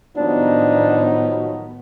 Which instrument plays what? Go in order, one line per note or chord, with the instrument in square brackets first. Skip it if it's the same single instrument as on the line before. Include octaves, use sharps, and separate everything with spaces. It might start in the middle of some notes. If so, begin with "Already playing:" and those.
[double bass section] A2 D#3 B3 [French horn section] F3 F#3 D#4 [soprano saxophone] D4